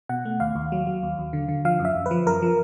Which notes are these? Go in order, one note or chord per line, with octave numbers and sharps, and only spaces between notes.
B2 F#5
A3
D#2 F5
D#2
F#3
F#3
D#2
D#2
D3
D3
F3 F5
F#2
E5
F#2
B4
F3
F#2 A#4
F3